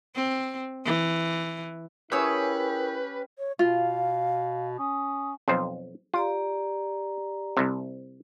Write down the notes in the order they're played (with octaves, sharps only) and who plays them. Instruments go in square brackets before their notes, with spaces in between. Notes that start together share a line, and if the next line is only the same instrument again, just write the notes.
[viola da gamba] C4
E3
[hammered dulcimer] C#4 G4 [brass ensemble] E4 A#4 [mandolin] G#4 C#5 E6 [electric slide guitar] B4
[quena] C#5
[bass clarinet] B2 [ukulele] F4 [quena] F5
[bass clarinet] C#4 [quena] D#6
[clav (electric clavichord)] B1 F2 C5
[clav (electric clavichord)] F4 [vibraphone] G4 D5 A#5
[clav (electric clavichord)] C2 C3